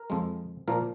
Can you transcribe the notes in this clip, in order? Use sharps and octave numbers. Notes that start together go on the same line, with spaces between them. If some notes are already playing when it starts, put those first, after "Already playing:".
Already playing: A#4
F2 F3 G#3
A#2 F3 A#3 A#4